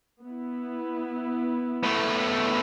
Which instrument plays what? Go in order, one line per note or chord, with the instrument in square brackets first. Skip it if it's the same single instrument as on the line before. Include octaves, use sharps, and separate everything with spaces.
[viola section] B3 E4
[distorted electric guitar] B2 A3